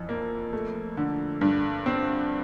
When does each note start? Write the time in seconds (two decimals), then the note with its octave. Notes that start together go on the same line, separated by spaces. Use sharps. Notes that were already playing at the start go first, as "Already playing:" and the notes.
Already playing: F2 E3
0.09 A#3
0.53 A3
0.97 D3
1.41 G2
1.86 C4